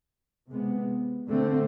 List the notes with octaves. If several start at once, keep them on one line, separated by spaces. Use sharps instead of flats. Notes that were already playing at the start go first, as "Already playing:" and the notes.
C3 G#3 B3
D3 A3 C4